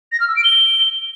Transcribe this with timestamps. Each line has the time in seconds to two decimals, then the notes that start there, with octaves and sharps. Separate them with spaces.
0.12 A#6
0.20 F6
0.28 E6
0.36 D7
0.44 G7